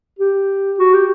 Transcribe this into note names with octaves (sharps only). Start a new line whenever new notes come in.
G4
F#4
G4